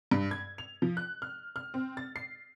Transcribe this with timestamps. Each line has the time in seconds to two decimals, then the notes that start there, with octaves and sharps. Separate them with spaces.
0.11 G2
0.31 G#6
0.58 F7
0.82 F3
0.97 F#6
1.22 F6
1.56 F6
1.74 C4
1.97 A6
2.16 C7